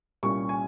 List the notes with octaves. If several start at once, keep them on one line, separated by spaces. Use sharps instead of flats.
C2 A#2 G3 C#4 C#6
G#5